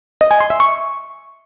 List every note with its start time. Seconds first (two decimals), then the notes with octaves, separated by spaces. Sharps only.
0.21 D#5
0.31 G#5
0.40 C6
0.50 E5
0.60 C#6